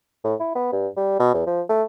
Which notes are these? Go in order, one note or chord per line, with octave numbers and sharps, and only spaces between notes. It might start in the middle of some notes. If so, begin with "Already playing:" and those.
A2
E4
B3
G2
G3
B2
E2
F3
A3